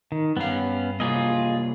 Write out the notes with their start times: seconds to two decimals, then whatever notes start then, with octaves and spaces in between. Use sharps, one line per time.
0.12 D#3
0.37 G2 B3 C#4 F5
1.00 C3 G3 A#3 F4 G#4 D#5